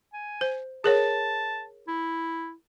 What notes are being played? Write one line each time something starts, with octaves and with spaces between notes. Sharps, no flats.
G#5
C5
G#4 A#4 C#5 A5
E4